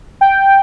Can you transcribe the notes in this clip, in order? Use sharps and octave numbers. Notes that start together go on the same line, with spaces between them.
G5